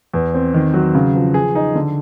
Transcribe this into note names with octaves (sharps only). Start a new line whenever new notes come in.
E2
C4
D#3
F#3
C#3
F3
G#4
D#4
D3